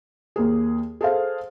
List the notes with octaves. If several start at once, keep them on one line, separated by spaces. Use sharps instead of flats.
D#2 A#3 G#4
G#4 A4 C5 F5